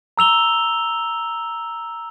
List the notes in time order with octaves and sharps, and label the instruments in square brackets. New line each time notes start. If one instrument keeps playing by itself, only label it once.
[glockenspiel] A#5 E6 F7 G7